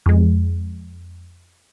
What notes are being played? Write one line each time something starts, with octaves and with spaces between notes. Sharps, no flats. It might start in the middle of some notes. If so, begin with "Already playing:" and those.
F2 G#3